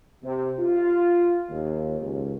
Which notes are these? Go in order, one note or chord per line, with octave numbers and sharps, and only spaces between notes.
C3
F4
D#2
C#2